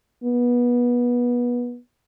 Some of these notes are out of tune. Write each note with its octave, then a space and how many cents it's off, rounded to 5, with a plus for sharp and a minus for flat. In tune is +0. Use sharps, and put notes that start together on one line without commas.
B3 -25